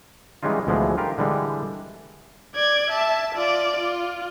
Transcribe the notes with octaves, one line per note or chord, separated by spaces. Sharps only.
E3 G3 G#3 C#4 D#4 F4
D2 E3 F3 G#3 B3
F4 G4 A#4
D3 E3 G3 G#3
D5 G#6
E5 A5
F4 D5
F4